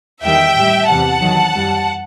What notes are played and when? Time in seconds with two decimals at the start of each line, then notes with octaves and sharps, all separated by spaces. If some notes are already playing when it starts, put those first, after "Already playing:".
0.23 E2 D#3 G3 E5 G5
0.56 A2 G3
0.87 E2 C3 E3 G3 F#5 A5
1.20 E2 D#3 F#3
1.54 F#2 E3 G3